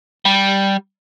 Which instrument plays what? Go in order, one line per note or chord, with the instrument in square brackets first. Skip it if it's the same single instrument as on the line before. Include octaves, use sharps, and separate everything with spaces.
[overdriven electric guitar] G3